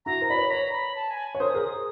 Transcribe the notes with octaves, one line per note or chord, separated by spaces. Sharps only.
E4 F#4 A#5
A#4 C5
D5 B5
B4 C#5
B4 C#5 A#5
B5
A5
G#5
C#5
A#4 C5 D#6
G#4 A#4
D#6